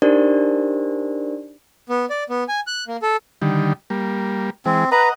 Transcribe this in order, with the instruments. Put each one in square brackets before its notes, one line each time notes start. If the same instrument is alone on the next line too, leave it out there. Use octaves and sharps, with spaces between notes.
[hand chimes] D4 D#4 G4 A#4 C5 D5
[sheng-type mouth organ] B3
D5
B3
G#5
F#6
A#3
A4
[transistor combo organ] D3 D#3 G3
G3 A#3
[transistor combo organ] E3 G#3 [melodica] C4
[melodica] B4 A#5 [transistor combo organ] D#5 F#5